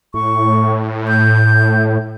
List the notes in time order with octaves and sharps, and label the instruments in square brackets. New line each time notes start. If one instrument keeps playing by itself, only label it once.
[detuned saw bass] A2 [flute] C#6
[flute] G6